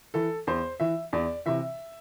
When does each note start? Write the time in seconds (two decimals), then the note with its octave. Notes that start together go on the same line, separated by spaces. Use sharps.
0.14 E3 A4
0.47 E2 C5
0.80 E3 E5
1.13 E2 D5
1.46 C3 E3 E5